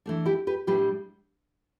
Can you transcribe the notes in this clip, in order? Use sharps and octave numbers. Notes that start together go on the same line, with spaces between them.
E3 A3 D4
E4 G4
G4 B4
A2 G3 D4 G4 B4